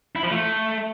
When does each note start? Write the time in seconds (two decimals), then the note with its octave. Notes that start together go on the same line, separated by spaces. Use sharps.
0.16 E4
0.23 F3
0.30 A3